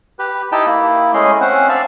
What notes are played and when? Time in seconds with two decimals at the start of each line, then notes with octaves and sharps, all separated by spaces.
0.19 G4 B4
0.52 D#4 E4 G4 D#5 G5 A5
0.66 A#3 E4
1.14 G#3 A3 C#4 E4 D#5 C6
1.41 C4 C#4 C5 F#5
1.69 D4 D5 E5 F5